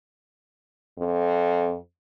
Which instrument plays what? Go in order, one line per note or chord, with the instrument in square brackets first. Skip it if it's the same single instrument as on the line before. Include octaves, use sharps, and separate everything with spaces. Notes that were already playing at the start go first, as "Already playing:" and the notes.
[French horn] F2